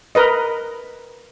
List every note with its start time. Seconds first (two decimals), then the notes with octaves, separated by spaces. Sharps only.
0.15 A#4 B4 D#5